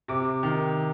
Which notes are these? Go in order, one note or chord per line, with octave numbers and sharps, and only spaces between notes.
C3 D6
D#3